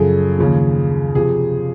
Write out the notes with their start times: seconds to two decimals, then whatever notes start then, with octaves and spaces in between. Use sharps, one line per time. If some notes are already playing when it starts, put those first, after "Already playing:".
Already playing: F#2 C#3 F3 G#4 A4
0.39 D#2 C#3 F3
1.15 C3 F3 G#4